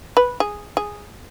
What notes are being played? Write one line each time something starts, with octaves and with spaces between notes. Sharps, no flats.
B4
G#4
G#4